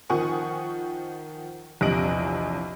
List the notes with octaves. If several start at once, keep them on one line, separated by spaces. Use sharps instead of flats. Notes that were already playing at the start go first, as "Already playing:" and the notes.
D#3 F3 F#5 G#5 C#6 D#6
A#1 E2 C3 D#5 D7 F#7